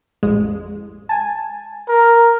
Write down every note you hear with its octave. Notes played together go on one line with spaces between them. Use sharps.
A1 F2 G#3
G#5 A5
A#4